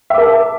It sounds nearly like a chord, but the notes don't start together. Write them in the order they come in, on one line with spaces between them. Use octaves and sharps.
E5 D6 A#4 A5